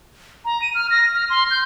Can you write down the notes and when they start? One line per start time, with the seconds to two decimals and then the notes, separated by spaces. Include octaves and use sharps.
0.45 A#5
0.62 D#7
0.75 F6
0.91 A#6
1.14 F6
1.30 C6
1.51 G6